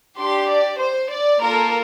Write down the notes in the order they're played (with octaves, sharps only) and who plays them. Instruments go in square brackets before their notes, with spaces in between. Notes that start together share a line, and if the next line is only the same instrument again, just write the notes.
[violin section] D4 G4 C6
D5
C5
D5
A#3 F4 A4 A#4